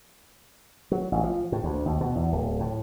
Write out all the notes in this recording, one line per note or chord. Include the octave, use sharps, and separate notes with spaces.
F#3
A1
F3
A2
D2
D#2
B2
E2
D1
A2